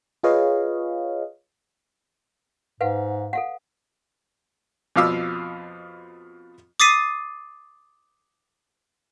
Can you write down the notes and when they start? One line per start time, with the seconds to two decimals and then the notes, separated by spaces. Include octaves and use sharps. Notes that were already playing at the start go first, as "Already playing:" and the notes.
0.23 F4 G#4 B4 C#5 D#5 F5
2.81 G#2 B4 F5 F#5
3.33 A4 F5 F#5
4.96 F2 B2 F3 F5 D6 E6
6.80 D6 D#6 A6 B6 C7 D#7